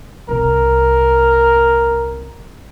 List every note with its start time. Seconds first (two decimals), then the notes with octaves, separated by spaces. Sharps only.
0.29 C2 C3 A#4